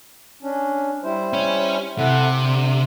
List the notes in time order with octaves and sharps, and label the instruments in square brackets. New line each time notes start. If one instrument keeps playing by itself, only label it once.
[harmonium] C#4 D4
G3 E4 C5
[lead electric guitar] C#4
[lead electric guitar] C3 [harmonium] E4 A4 F#5
[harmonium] D3